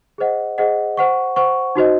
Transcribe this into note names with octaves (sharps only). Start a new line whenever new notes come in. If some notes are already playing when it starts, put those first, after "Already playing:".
G#4 C5 D#5 F#5
G#4 C5 D#5 F#5
C5 F#5 C#6
C5 F#5 C#6
D#4 F#4 C5 D#5